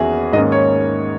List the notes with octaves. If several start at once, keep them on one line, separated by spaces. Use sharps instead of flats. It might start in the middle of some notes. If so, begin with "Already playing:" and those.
Already playing: E2 D#3 A#3 C#4 F#4 G#4 E5
G#2 D#3 A#3 C#4 D#5
C#5